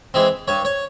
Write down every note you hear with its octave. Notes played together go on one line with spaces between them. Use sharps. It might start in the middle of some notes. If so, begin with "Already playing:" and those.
E3 G#3 C4
G2 C#5
C#5